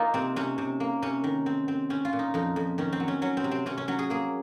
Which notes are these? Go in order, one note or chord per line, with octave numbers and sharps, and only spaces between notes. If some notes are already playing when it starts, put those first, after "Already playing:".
Already playing: A#3 D#4 F4
C3 C4
C3 C#4
C3
A#3
C3 C#4
D#3
C4
C4
C4 C#4
F4
A#2
D#4
F2 D#4
F2
D#3 C#4
C4
F#3
C#4
F#3 C#4
C4
C3
C4
C3 C#4
C#4
F#3 C#4
G#4
A#3 G#4